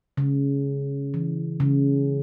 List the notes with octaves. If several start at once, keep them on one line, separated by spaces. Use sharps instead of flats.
C#3
E3
C#3